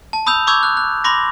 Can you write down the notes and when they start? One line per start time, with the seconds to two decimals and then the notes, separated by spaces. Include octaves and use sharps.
0.13 A5
0.26 B5 D#6 E6 G6 F7
0.47 B5 C#6 D6 E6 G6 G#6
0.63 F#6
0.77 F#6
1.04 B5 C6 D6 A#6